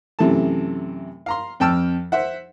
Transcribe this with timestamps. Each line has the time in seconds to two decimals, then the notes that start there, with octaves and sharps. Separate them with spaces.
0.19 F#2 C3 E3 A3 A5
1.26 F5 A#5 C6
1.60 F2 G5 A5 E6 F6
2.12 C5 E5 F#5